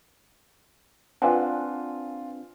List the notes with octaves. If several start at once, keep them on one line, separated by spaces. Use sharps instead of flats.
C4 D4 F4 B4 F#5 G#5 A5